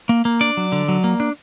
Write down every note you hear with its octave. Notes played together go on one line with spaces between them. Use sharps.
A#3
A#3
D4 D5
F#3
D3
F#3
A#3
D4